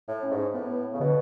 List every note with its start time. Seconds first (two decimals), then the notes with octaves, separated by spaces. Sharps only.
0.08 A2
0.23 C#4
0.31 G#2
0.54 A2 B3
0.93 C#3
1.00 B2 D3